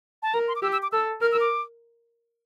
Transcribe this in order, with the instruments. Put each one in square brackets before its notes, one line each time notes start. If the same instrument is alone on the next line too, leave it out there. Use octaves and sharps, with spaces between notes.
[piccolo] A5
[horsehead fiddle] A#4 [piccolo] A#5
[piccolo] C6
D6
[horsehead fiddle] G4 [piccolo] E6
[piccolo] E6
D6
[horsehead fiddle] A4 [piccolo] E6
[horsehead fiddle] A#4 [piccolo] F6
[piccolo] E6
D6